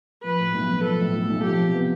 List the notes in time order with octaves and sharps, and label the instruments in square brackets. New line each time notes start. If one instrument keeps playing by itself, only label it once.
[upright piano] F3 [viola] B4
[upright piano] A2
B1
B1
[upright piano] F3 [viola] A4
[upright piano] A2
B1
B1
[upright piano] F3 [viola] G4
[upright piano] C3
B3